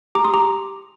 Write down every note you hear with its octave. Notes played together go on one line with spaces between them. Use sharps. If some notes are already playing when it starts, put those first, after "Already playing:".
G4 A#5 D6
C6 D#6
G4 A#5 D6